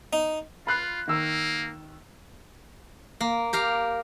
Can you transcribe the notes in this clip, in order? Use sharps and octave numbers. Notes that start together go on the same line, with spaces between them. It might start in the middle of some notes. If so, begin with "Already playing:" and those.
D#4
F4 B5 F#6 C7
D#3 A#3 E6
A#3
G4 A#4 F5